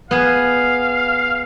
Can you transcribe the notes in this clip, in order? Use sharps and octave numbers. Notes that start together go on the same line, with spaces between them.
B3 G#4 F5